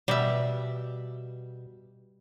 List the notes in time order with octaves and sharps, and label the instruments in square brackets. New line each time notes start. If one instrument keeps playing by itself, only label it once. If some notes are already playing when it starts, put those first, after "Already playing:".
[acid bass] B2 [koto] G3 E5